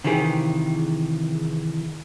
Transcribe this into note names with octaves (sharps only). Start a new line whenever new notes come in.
C3 D#3 E3 G4 G#4